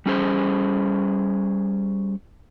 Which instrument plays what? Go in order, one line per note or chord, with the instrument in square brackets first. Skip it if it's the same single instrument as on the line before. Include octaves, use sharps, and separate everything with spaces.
[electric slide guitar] G3 C#4 G#4 C5